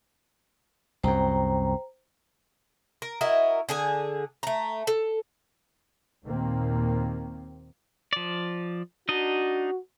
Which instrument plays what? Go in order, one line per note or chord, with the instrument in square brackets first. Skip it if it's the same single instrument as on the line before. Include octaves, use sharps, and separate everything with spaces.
[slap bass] C2 F#2 [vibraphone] C5 G5 A#5
[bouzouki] A#4
E4 F#4 A#4 D#5
D3 G#4 G#5
A3 A#5
A4
[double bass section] D#2 A#2 D#3 A#3 C4
[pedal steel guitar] F3 D5
[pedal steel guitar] D4 D#4 D#5 [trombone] F#4